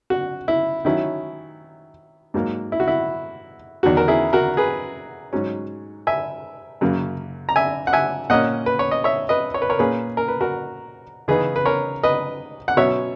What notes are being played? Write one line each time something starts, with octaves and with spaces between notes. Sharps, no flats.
F#4
E4
D#3 F#3 C#4 E4
G#2 F#3 A#3
E4
F#4
E4
E2 D#3 F#3 F#4
A#4
E4 G#4
F#4 A#4
G#4 B4
G#2 F#3 C#4
E5 G#5
F#2 C#3 F#3 A#3
A#5
E5 G#5
F#5
E5 G#5
A#2 A#3 C#4 D#5 F#5
B4
C#5
D#5
C#5 E5
B4 D#5
C#5
B4
A#4 C#5
A#2 A#3 C#4 G#4 B4
A#4
B4
F#4 A#4
C#3 E3 B3 D#4 G#4 B4
B4
A#4 C#5
B4 D#5
F#5
B2 F#3 C#4 C#5 E5